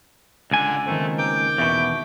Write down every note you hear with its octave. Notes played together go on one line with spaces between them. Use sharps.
C#2 D3 D4 G#5
D#3 A3 A#3 C4
A#4 G5 D6 G6
E2 B2 E5 C#6